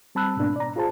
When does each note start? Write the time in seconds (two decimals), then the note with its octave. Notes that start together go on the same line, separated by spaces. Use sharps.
0.15 G3 C4 A5 B5 E6 F#6
0.37 G#2 B2 A#3 B3 D4
0.56 D5 A#5
0.76 F4 G#4 C5 A5